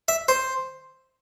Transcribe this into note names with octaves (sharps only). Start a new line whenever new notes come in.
E5
C5